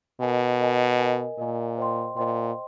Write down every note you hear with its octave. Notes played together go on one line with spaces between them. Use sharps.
B2 A#4 D#5 G#5
A#4 D#5 G#5
A#4 D#5 G#5
A#2 A#4 D#5 G#5
C5 D#5 G5 C6
A#2 C5 D#5 G5 C6